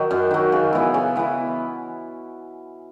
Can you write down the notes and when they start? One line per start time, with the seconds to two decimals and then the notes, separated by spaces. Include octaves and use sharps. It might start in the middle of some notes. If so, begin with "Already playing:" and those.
Already playing: D#3 F#3 D#4
0.11 F#2
0.31 D#3 F#3
0.52 C#3
0.73 E3 B3 E4
0.94 C#3
1.16 E3 B3 E4